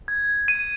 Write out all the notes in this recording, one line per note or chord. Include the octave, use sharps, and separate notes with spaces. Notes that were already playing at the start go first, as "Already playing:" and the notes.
G#6
D#7